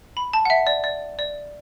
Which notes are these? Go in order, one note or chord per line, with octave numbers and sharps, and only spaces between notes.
B5
A5
F#5
E5
D5
D5
D5